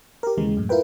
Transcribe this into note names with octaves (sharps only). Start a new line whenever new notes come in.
G4 A#4
D#2 C#3 E3 G#3
F#2 A2
E4 F4 A#4 B4 G5